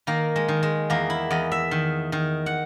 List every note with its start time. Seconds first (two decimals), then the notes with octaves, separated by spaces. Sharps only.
0.07 D#3 A#3
0.36 G#3
0.48 D#3
0.63 G#3
0.90 E2 A#3
1.10 E4
1.31 E2 D#5
1.52 E5
1.71 D#3
2.12 D#3
2.46 F#5